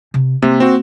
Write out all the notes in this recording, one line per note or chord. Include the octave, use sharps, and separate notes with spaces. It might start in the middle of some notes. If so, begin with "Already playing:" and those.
C3
C3 A#3
C4 F#4